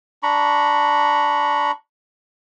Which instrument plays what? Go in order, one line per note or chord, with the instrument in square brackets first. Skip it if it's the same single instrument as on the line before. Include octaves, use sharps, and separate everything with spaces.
[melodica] D4 A#5 B5 C#6